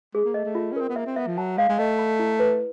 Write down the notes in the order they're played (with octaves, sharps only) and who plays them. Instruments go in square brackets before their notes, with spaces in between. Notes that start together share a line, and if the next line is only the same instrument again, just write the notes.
[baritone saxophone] G#3 [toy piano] G#4
[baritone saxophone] A#3
[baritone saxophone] A3 [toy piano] D#5
[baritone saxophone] A3
[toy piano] F4
[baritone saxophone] C#4
[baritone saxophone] C4 [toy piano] A#4
[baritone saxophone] B3
[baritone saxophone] A#3 [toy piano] E5
[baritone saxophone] C4
[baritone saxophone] B3 [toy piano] E5
[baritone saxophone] F3
[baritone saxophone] F#3 [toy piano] A5
[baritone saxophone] G#3 [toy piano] F5
[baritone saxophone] G#3
[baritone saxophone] A3 [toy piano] D#5
[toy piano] B5
E4
B4